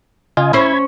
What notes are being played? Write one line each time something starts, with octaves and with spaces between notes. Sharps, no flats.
C#3 F4 D#5 G#5
C#4 E4 C5 B5 G#6